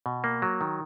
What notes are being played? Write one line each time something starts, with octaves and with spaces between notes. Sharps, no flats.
B2
A#3
F#3
D#3